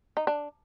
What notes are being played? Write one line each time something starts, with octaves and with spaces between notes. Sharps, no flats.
D#4
D4